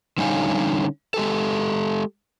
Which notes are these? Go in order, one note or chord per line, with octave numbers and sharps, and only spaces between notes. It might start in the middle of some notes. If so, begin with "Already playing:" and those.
D3 G3 C#4 D#4 F5 G#5
G#3 G4 A4